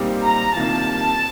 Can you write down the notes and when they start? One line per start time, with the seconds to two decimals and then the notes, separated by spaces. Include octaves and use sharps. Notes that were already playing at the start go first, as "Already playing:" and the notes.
Already playing: A#2 G3 C4 D#4 G4
0.23 A#5
0.55 C2 C3 D#3 A#3 F4 A5